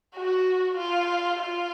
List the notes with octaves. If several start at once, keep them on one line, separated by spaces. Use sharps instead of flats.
F#4
F4
F4